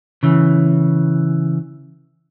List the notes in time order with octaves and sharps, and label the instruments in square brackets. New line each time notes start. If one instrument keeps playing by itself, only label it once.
[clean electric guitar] C#3 E3